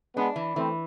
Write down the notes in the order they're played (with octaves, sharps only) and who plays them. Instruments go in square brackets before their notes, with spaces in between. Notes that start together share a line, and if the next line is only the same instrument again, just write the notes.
[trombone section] G#3 B3 [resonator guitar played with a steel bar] D4
[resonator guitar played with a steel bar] E3
[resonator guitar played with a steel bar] E3 [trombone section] A3 C4